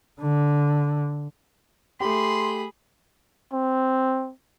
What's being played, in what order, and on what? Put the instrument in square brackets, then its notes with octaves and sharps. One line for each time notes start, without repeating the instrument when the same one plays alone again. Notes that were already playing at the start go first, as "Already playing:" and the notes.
[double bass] D3
[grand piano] A3 G4 [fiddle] G#4 B5 [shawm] C6
[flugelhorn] C4